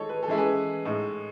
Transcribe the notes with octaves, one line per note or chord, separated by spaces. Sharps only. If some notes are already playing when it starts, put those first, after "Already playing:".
Already playing: D#3 G#3 D#4 A4 C#5 D#5
B4
A4
E3 G#3 C#4 E4
G#4 B4
A2 G#3 D#4